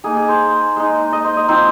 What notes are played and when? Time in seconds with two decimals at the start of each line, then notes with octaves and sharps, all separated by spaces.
0.04 A#3 D#4 G#4
0.17 G#4
0.29 C5
0.76 G#3 D#4
1.13 D#5
1.24 C5
1.37 D#5
1.48 F3 C4 D#4 C5